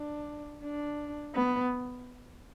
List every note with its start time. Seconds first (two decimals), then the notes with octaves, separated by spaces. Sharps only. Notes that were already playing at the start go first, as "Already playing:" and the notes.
Already playing: D4
0.63 D4
1.35 B3